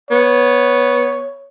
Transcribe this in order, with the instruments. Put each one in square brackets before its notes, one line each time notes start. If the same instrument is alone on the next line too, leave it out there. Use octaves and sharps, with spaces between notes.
[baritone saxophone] B3 [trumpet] C#5